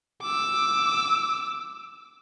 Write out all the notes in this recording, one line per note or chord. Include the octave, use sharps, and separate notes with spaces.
D6 E6